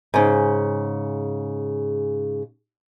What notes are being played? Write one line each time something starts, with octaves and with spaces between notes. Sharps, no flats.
G#2 C#3